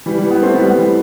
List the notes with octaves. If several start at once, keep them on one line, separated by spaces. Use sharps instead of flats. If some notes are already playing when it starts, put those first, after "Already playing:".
E3 G3
E3 G3
G3 B3
A3 C4
G3 B3
G3 B3
E3 G3